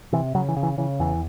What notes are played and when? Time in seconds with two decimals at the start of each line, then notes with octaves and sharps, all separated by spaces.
0.13 C3 E3
0.35 C#3 F#3
0.49 E3
0.56 C#3
0.63 E3
0.78 C#3 E3
0.99 E2 E3